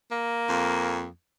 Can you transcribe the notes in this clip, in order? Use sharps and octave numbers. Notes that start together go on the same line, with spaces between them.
A#3
F2